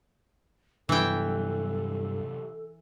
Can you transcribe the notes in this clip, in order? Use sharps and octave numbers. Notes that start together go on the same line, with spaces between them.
G2 C3 E3 F#3 B3 A4 G5